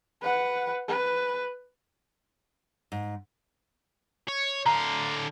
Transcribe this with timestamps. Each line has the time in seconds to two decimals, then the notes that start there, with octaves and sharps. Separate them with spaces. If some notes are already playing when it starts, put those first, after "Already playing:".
0.22 B4 F#5
0.89 B4
2.92 G#2
4.28 C#5
4.66 D3 F5 A#5